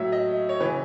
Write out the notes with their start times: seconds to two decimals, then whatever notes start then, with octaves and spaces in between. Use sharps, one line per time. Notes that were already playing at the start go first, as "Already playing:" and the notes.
Already playing: A2 F#3 E5
0.12 D#5
0.49 C#5
0.60 C#3 E3 B4